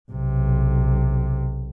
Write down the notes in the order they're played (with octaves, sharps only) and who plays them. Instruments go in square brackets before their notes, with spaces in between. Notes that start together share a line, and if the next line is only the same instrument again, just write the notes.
[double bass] B1 C3